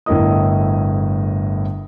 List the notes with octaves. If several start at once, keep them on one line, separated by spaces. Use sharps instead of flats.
G1 A2 E4 A#4 D#5 D#6